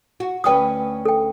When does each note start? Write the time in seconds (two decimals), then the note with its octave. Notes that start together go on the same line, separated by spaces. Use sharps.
0.20 F#4
0.44 D2 C#4 B4 G5 D#6
1.05 A4 G5